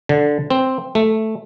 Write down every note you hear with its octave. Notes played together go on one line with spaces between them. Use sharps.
D3
C4
A3